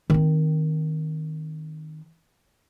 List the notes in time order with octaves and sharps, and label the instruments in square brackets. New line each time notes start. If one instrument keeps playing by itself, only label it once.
[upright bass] D#3 C4